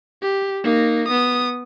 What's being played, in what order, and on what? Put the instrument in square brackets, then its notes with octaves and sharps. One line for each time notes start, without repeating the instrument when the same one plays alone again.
[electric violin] G4
A#3 D#4
B3 D#6